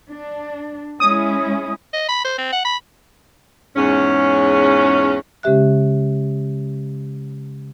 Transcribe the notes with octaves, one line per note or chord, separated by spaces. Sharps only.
D4
G#3 C#4 E4 D#6
D#5
B5
C5
C4
F#5
B5
E2 G#2 C#4
C#3 G#3 C#4 G4 E5 F#6